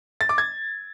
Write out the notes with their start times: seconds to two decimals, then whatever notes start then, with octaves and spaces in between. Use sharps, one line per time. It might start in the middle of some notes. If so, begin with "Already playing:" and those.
0.21 A6
0.29 D6
0.38 G#6